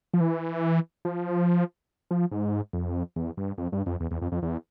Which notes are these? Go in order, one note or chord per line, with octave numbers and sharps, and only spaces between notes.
F3
E3
F3
F3
G#2
F2
E2
G2
F2
G2
F2
E2
E2
F2
F2
E2